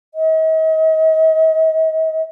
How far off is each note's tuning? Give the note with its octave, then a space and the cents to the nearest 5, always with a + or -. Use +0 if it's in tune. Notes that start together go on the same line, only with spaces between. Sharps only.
D#5 +40